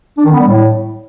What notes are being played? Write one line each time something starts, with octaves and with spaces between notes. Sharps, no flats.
D4
D#3
B3
G3
A2